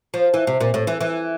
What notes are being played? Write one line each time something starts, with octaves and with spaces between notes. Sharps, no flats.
F3
E3
C3
A#2
A2
E3
E3